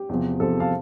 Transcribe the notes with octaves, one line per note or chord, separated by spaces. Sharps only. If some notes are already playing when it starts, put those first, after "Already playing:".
Already playing: G4
E2 C3 F3
E2 C3 F3 A4
F5 A5